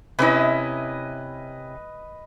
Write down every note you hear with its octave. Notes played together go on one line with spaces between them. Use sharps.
C3 C#4 E4 B4 D#5